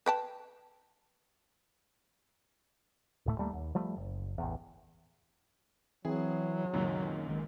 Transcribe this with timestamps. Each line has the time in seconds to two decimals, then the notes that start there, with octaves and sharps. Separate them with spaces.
0.06 B4 G5 A5
3.26 D1 A2 A3
3.38 D#2 G3 A3 A#3
3.53 D#2
3.75 F3 G3 A3
3.97 F#1
4.38 A1 E2
6.05 E3 F#3 C4 G#4
6.74 C#2 F#2 A#2 D#3
7.29 G1 D#3 G#3